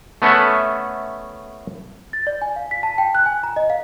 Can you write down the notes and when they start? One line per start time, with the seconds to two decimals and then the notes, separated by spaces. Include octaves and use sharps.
0.22 A3 B3 C#4 A4 E5 F#5
2.13 A6
2.27 D5
2.42 G#5
2.56 F5
2.71 B6
2.83 A5
2.98 G5
3.15 F#6
3.26 G#5
3.43 A#5
3.56 D#5
3.70 F5